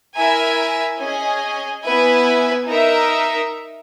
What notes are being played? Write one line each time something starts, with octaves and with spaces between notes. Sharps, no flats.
E4 A#4 E5 G#5
C#4 G#4 D#5 G#5
B3 E4 B4 E5 G#5
D#4 A#4 E5